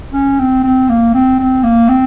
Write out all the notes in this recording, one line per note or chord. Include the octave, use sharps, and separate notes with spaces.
C#4
C4
C4
A#3
C4
C4
A#3
C4